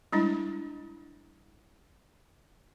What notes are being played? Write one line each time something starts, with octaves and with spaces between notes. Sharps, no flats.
G3 G#3 D4 E4